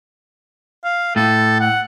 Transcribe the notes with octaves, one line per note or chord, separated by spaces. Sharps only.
F5
A2 A4
F#5